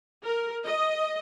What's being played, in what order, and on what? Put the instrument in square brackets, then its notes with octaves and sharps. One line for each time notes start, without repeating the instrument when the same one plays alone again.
[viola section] A#4
D#5